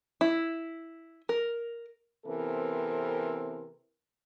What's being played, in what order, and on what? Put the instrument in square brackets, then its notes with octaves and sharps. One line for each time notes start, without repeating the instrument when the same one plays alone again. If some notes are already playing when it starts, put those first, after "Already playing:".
[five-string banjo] E4
A#4
[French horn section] C3 E3 B3 C4 A4 A#4